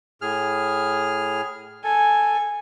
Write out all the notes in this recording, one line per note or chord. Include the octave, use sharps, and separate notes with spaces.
A2 G#4 F6
A4 G#5